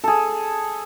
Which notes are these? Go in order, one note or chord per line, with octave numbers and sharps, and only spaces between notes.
G#4 A4